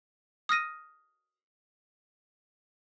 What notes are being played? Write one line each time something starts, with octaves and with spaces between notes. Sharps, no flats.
D#6 F6 A#6 D#7